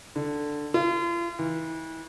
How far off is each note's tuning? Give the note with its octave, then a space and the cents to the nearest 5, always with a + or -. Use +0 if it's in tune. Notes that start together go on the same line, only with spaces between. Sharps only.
D3 +5
F4 -40
E3 -30